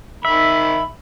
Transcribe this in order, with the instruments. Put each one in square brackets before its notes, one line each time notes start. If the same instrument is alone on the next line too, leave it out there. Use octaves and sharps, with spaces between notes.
[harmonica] D#3 B5 [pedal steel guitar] E5